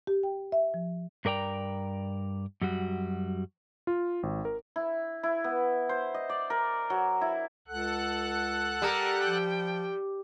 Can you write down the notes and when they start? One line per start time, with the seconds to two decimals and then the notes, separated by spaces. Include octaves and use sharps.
0.07 G4
0.23 G5
0.52 E5
0.74 F3
1.25 G2 A#4 D5 G5 A#5
2.61 F#2 G3 F#4
3.87 F4
4.23 G#1
4.45 A#4
4.76 E4
5.23 E4
5.44 B3
5.89 C5
6.14 D#5
6.29 D5
6.50 A#4
6.90 F#3
7.21 E4
7.68 C#2 A4 F#5 F#6
8.82 G3 A#4
9.24 F3 G5